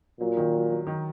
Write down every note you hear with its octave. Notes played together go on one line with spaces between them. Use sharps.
A#2 F#3
D#3
F#3
F#3
D#3